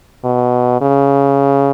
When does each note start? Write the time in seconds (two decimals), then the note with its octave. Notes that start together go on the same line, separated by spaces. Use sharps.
0.24 B2
0.81 C#3